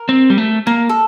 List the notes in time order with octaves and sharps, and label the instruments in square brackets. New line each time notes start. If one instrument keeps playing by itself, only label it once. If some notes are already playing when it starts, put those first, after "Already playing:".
Already playing: [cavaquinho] A#4
[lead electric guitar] C4
G3
A3
[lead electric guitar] A#3 [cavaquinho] A#4
[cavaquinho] A4